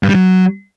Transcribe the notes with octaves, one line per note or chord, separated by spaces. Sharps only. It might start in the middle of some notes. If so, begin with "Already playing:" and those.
G2
G3
F#3